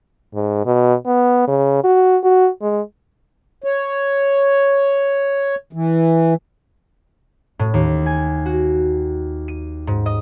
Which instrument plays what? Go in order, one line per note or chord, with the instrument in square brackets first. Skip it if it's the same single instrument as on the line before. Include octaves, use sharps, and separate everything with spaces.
[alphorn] G#2
B2
B3
C#3
F#4
F#4
G#3
[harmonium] C#5
E3
[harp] A2
D#2
G#5
F#4
D#7
G#2
D#5